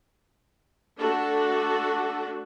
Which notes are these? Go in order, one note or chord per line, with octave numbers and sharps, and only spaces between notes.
A3 D4 F#4 A4